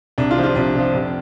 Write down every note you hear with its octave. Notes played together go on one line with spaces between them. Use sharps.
C2 D4
F4
C3 F3
F4
C2 D4
C3 F3
F1